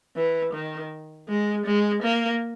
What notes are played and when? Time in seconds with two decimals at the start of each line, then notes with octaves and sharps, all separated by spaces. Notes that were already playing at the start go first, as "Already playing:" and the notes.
0.16 E3
0.53 D#3
1.29 G#3
1.66 G#3
2.03 A#3